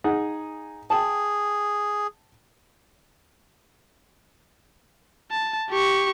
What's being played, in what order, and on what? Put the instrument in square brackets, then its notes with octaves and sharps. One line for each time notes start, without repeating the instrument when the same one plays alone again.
[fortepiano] D#4 G#4 F#5
[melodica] G#4 [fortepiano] G5 A5
[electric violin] A5
G4 C#6